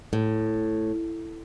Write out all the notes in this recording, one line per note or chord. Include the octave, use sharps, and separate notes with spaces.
A2